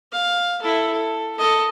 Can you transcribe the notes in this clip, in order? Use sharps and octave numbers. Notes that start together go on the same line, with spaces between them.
F5
E4 A4
A4
A4 D#5